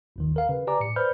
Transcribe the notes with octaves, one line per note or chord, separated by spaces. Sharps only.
G1 D#2 D#3
A#4 F5
C#3 B4
G4 B4 D5 G#5 A#5 D6
A2 C#7
B4 C5 D5 B5 F6 G6